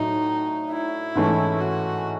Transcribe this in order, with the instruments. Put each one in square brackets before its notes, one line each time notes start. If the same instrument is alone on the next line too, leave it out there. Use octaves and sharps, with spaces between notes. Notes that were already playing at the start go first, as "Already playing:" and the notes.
Already playing: [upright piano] A2 F#3 D4 [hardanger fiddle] D#4
[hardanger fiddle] E4
[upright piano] G#2 E3 A3 C#4
[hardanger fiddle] F#4